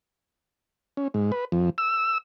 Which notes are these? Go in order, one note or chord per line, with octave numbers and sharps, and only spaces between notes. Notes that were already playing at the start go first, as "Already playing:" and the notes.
C#4
G#2
B4
F2
E6